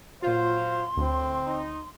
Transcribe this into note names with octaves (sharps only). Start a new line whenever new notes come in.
A#2 F#3 F4 C5 F5 C6
D2 A2 C4
D#4